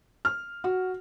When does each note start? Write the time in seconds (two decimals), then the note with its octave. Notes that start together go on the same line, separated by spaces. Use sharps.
0.25 F6
0.64 F#4